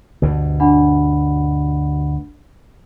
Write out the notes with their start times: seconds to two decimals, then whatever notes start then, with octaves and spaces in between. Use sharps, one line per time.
0.22 D2 G2 B2
0.60 D4 F#5 B5